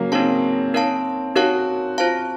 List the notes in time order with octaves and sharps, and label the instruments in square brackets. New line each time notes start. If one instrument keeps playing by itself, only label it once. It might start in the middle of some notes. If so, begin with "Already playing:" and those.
Already playing: [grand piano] C#3 F#3 A#3
[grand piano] C4 [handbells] D#4 A#4 C#5 F5 A5
[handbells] D#4 A#4 C#5 F5 A5
[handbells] D#4 A#4 C#5 F5 A5 [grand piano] F#4
[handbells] F4 C5 F5 A5